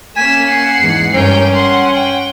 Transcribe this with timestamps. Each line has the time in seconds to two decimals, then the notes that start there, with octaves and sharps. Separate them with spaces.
0.17 A#3 C#4 G#5 B6 E7
0.49 F#5 C7
0.81 E2 G#2
1.14 G2 C#4 A#4 G5
1.55 F#5 C6
1.95 G5